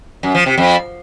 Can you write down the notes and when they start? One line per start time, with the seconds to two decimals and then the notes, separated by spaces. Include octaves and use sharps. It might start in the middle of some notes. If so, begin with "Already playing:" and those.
0.23 F#2
0.35 F3
0.46 C3
0.58 F2